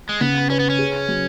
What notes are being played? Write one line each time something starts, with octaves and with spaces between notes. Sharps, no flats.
G#3
C#3 B3
C#4 B4
B3
C#4
G#4
F#3